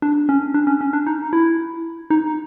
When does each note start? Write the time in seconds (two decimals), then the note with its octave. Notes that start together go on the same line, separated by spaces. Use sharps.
0.02 D4
0.29 C#4
0.54 D4
0.67 C#4
0.81 C#4
0.93 D4
1.07 D#4
1.33 E4
2.10 D#4